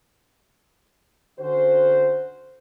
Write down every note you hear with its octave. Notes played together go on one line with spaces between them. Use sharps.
D3 C#4 F#4 C5